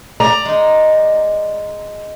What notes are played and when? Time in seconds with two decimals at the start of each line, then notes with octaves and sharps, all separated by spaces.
0.20 D5 A#5
0.45 G#3 D#4